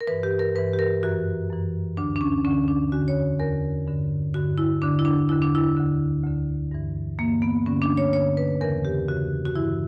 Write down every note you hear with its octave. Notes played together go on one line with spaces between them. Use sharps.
A#4
G2 E3 B4
G4
A#4
G2 E3 B4
G4
A#4
F#2 E3 F#4
F#2 E3
D2 D3 D4
D4
C#4
D2 D3 C#4
D4
E2 D3 F#4
C#5
E2 D3 A#4
G2 D3
G2 D3 F#4
E4
E2 D3 D4
E4
D4
E2 D3 E4
D4
E4
D2 D3
D2 D3
G2 E3
G2 E3 A#3
B3
G2 D3 C#4
D4
C#5
G2 D3 C#5
B4
E2 C#3 E3 A#4
G4
E2 C#3 E3 F#4
F#4
G2 E3 E4